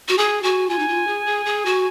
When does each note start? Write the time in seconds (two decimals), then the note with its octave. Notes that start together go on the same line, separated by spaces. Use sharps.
0.08 F#4
0.17 G#4 G#5
0.43 F#4 G#5
0.69 F4 G#5
0.79 D#4
0.88 F4
1.07 G#4
1.26 G#4
1.46 G#4
1.66 F#4